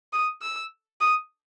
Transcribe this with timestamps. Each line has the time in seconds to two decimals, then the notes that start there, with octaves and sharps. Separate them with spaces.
0.13 D#6
0.42 E6
1.01 D#6